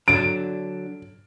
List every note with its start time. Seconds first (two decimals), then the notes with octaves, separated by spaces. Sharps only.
0.08 D3 F#3 D4 D7